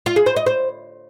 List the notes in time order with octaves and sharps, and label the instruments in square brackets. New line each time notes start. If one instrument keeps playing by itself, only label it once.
[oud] F4
G#4
C5
D#5
C5